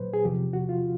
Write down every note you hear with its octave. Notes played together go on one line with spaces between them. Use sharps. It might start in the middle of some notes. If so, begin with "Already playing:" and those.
Already playing: A#2 F#3 B4 C5
G#4
E2 C3 F3 G4
F#4
F4